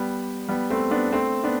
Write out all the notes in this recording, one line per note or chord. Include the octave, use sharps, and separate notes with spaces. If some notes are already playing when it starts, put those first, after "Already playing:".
Already playing: G3 B3
G3 B3
A3 C4
B3 D4
A3 C4
B3 D4